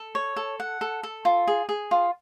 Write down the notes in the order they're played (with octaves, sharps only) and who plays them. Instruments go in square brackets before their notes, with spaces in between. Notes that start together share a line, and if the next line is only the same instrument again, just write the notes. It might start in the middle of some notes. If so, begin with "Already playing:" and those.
Already playing: [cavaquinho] A4
C#5
A4
F#5
A4
A4
F4
G#4
G#4
F4